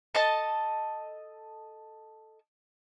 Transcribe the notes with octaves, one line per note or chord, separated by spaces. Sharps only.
A4 D#5 A5